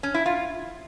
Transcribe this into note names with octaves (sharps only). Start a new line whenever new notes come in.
C#4
E4
F4